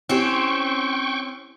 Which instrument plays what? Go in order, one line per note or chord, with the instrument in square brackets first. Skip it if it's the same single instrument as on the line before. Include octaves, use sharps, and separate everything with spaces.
[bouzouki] C4 C#4 [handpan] E4 G4 [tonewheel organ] G5 C#6